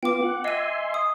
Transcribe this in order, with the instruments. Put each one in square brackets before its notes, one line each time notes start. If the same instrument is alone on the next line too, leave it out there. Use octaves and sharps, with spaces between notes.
[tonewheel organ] B3 F4 [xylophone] G5 D6
[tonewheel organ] F#5
[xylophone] D#5 D#7 [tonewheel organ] E5 G#5 C6
[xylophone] D#6